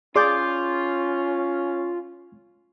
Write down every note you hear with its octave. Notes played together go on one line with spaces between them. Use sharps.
C#4 F4 G#4 D5 C6 D6 G6